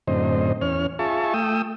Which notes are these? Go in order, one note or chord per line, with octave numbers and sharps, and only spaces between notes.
F#2 A2 D3 C4 C5 D#5
E2 C#4 C#5 F6
F4 G#4 E5 A5 C#6
A3 G5 D#6 E6